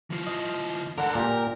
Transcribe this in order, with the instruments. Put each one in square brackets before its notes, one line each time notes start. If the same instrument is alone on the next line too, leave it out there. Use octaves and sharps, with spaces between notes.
[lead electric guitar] E3 F4
[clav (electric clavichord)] D#5
[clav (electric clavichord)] D3 F#5 [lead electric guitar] A4 A#4
[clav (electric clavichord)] A#2 G4 [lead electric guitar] A#4